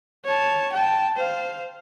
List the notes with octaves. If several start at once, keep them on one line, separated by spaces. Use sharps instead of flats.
C#5 A5
G5 A5
C5 F5